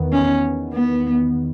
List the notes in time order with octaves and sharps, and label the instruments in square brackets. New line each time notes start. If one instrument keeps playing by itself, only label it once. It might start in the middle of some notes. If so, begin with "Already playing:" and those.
Already playing: [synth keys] E2 D#3 B3
[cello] C#4
B3